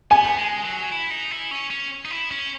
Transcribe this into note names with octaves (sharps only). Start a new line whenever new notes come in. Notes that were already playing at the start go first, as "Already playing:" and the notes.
B3 G#5
G#3
F#3
E4
D#4
E4
C#4
C#4
D#4
E4
C#4